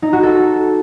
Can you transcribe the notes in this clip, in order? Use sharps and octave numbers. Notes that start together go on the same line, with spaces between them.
D#4
F#4
A4